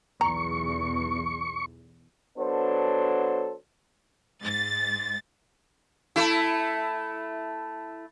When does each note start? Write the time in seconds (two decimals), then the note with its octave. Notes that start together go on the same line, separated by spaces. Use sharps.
0.21 B1 E2 A#5 C#6
2.38 F#3 B3 D4 A4 C5
4.41 G#2 A6
6.16 A3 E4